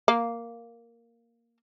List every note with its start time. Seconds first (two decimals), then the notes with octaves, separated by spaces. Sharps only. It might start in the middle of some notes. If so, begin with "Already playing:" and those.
0.08 A#3 F5